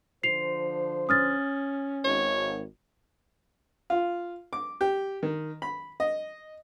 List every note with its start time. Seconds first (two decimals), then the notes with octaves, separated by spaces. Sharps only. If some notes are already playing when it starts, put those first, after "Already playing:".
0.23 D3 F3 C5 C7 F7
1.09 C#4 D#6 F6 A6
2.05 G#1 C#5
3.90 F4
4.53 D6
4.81 G4
5.23 D#3
5.62 B5
6.00 D#5